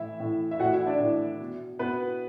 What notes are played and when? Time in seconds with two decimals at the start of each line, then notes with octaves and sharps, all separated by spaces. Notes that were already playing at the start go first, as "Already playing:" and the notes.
Already playing: A2 E3 E4 E5
0.20 A2 E3
0.51 E5
0.60 A2 F#4 F#5
0.64 E3
0.73 E4 E5
0.87 D4 D5
1.00 A2 E3
1.40 B2
1.79 B2 B3 B4